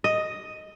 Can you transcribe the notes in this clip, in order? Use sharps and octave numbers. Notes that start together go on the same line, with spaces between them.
D#5